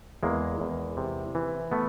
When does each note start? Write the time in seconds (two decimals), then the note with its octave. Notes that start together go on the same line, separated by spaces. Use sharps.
0.23 E2 G#3 A#3
0.60 E2
0.97 C3
1.35 E3
1.72 A3 B3